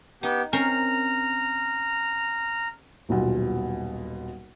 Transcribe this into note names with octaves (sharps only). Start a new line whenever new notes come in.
B3 D#4 G4
C4 C#4 A#4 A#5 F6
D#1 B1 B2 F4